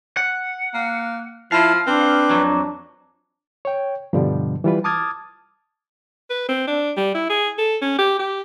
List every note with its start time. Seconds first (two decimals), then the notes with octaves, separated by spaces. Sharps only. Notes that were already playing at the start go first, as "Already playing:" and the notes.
0.17 F#5
0.74 A#3
1.52 F3 E4 F5 A5
1.86 C4 D4 B4
2.31 F2 F#3
3.65 C#5 G5
4.13 G2 B2 D3 F3 G3
4.64 E3 G3 F4 B4
4.84 A5 D6 D#6 F6 G#6 A6
6.30 B4
6.49 C4
6.68 D4
6.97 G3
7.15 E4
7.30 G#4
7.59 A4
7.82 C#4
7.99 G4
8.19 G4